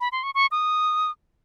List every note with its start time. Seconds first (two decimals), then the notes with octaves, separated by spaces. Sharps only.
0.01 B5
0.12 C6
0.23 C#6
0.35 C#6
0.51 D#6